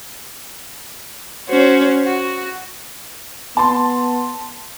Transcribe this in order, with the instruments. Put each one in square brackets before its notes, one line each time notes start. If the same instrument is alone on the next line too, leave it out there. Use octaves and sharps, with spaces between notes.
[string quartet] C#4 F#4 C5
F#4
[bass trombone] B3 [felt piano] A5 C6